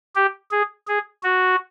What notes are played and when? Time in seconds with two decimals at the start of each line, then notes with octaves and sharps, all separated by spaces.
0.16 G4
0.52 G#4
0.88 G#4
1.23 F#4